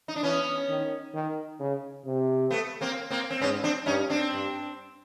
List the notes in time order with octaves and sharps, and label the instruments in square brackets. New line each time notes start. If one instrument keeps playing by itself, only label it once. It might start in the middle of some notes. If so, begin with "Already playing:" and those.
[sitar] D#4
D4
[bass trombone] E3 [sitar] B3 C#4
[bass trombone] D#3
D#3
C#3
C3
[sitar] A3 B3
A#3 C4
A#3 C4
C4
[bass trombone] G#2 [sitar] B3 C#4
[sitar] C4 D4
[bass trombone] G2 [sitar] C#4 D#4
[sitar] C4 D4
[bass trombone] G2